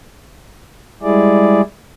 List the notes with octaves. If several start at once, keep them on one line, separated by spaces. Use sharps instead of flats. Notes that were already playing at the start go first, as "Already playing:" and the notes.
G3 G#3 E4 G#4 D5